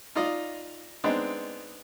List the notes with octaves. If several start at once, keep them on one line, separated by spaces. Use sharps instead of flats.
D#4 F4 D5 D#5
G#3 B3 C4 D4 D#4